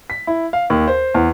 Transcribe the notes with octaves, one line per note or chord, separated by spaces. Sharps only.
B6
E4
F5
D#2
C5
E2